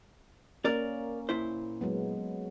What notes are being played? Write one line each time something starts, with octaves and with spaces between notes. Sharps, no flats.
A#3 C#4 A#4 D5
A#2 E4 C5
F#3 G#3 B3